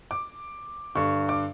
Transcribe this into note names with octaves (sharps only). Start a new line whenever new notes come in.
D6
G2 D3 C#6
D6